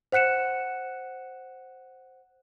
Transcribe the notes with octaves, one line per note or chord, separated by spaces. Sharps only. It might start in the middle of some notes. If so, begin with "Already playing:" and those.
C5 F#5 F#6 C#7 E7